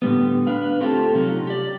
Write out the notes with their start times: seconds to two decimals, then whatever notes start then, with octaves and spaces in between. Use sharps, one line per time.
0.02 A2 D3 G3 B3
0.47 D4 B4 F5
0.80 A3 C4 F4 G4 A4
1.15 C3 F#3 C#4 D#4 F4
1.47 G4 D5